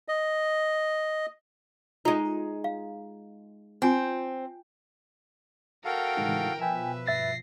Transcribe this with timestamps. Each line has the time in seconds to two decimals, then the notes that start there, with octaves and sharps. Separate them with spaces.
0.08 D#5
2.05 G#3 D#4 F4
2.64 F5
3.82 C4 F4 G#5
5.85 F#4 A4 A#4 F5 G5
6.17 A2 C#3 E3 G#3 D#4
6.61 B2 F3 B4 E5 G5 G#5
7.07 G2 E5 A6 A#6 C7